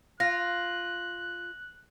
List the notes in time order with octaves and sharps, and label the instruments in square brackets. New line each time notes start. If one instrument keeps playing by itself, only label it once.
[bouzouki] F4 [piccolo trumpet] F#6 [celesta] A#6